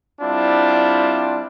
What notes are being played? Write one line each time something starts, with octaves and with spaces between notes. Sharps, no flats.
G3 C4 D4 E4 F4